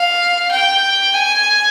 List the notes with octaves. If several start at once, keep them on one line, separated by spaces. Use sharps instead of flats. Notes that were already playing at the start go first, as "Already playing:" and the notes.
Already playing: F5
G5
G#5